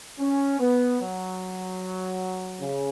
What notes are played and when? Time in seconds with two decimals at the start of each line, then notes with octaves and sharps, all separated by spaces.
0.20 C#4
0.59 B3
1.00 F#3
2.61 C#3